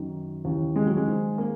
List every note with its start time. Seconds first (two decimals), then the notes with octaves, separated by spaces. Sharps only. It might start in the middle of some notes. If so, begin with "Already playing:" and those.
Already playing: F#2 D#3
0.45 D#2 C#3 E3
0.76 G#3
0.86 F#3
0.97 G#3
1.07 G#2 D#3
1.38 A#3